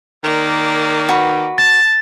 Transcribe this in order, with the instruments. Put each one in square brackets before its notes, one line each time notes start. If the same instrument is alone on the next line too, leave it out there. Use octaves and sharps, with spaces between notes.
[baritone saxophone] D#3 [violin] A#3 D5
[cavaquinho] F#4 B4
[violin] A5 [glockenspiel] A6